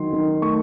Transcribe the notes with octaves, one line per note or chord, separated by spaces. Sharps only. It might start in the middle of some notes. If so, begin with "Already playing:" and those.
Already playing: D#3 F#3 C6
D#3
A3 C#6